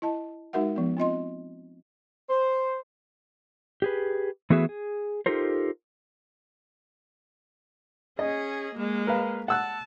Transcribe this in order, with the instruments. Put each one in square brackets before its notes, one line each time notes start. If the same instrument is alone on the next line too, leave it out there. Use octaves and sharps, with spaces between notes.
[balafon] E4 D#5 A5
G#3 D#4 F#4 A#4 E5 F#5
F3 B3
C4 F4 D#5 C6
[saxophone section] C5
[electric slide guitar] G4 G#4 B4
E3 A3 B3 F#4 G#4 E5
G#4
D#4 F4 G4 A4 A#4 C5
[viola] C#4 G#4 [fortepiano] D#5
[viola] G#3 A#3
[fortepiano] A#4 B4 F5
[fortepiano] F#5 E6 F#6 [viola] A5